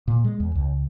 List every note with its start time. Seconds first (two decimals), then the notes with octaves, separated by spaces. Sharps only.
0.08 A#2
0.24 G#3
0.40 E2
0.55 C#2